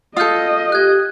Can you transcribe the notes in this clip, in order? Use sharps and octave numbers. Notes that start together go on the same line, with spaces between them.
F4 A4 D#5 D#6 F6 G6
G4 F#6 G#6